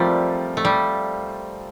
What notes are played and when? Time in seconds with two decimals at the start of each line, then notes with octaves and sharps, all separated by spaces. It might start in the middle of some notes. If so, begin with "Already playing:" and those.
Already playing: F3 G3 A3 C4 F4 A#4 D5
0.57 A3
0.65 G3